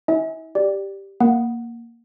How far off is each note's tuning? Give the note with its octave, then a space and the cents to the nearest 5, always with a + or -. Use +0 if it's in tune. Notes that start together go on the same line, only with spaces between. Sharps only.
E4 -45 E5 -40 G#5 +0
G4 +0 D5 +0
A#3 +0 F#5 +0